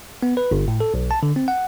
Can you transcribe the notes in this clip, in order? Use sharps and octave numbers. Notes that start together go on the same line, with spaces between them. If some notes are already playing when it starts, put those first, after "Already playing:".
B3
B4
G1
A2
A4
B1
A5
D3
C4
F#5